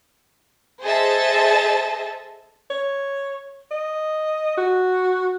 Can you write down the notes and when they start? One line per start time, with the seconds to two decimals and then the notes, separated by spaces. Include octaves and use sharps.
0.82 G#4 A4 C5 D#5 E5 A5
2.71 C#5
3.71 D#5
4.58 F#4